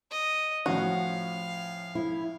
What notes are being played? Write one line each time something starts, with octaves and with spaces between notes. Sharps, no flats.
D#5
A2 F3 C#4 F#4 F5
E4